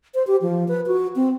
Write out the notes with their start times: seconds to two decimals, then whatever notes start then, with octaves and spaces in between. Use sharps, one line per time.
0.15 C5
0.27 G4
0.42 F3
0.68 B4
0.87 F#4
1.16 C4